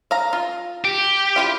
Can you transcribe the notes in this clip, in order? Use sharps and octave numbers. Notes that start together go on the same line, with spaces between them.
F5 A#5
F4
G4
E4 F4 F5